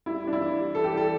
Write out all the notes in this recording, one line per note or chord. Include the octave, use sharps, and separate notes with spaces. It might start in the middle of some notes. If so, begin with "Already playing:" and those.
G3 E4
G3 D4
E4
E3
G3
E3 A4
G4
G3 A4